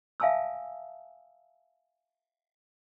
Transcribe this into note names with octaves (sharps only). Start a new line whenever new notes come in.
E5 F5 G#5 A5 D#6 E6